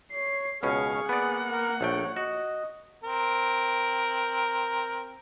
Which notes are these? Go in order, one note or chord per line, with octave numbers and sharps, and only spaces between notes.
C#5 C7
C#2 B2 C#4 G#4 F5 C#6
A#3 B3 D5 F#5
A#4
A#1 A3 C#5 G5
F#4 D#5
C4 A#4